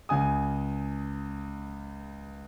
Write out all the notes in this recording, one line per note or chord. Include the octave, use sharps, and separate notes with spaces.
C#2 C#3 G#5 D#6